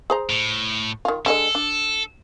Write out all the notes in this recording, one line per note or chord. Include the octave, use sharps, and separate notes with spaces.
G#4 C5 A#5
A2
D#3 F4
D3 G#3 A4 D#5
D4